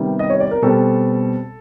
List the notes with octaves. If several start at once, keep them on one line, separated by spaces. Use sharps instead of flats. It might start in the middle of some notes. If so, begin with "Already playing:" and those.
Already playing: C3 D#3 G3 B3
D#5
C#5
D5
A#4
B2 G3 C4 A4